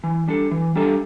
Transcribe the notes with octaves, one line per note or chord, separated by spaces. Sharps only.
E3
G3 D4 A4
E3
G3 D4 A4